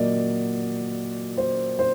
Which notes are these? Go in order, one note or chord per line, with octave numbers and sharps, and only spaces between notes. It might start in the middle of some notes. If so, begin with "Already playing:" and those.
Already playing: A#2 F#3 A#3 D5 D#5
C5
C5